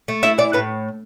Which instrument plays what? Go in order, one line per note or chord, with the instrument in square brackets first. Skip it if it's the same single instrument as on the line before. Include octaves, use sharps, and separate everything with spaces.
[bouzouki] A3
E4 E5
E3 D5
A2 B4